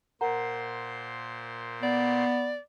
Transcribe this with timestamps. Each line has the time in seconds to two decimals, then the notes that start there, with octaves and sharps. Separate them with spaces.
0.21 A#2 A#4 C5 F#5 A#5 C6
1.83 B3 D5